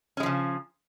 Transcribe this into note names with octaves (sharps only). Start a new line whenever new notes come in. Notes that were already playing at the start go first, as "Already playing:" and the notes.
C#3 F3 G#3 C#4